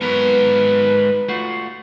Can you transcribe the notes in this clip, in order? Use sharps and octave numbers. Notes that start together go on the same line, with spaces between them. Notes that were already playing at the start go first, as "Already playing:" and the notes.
G#2 F#3 B3 A#4 B4
A3 F4 F#4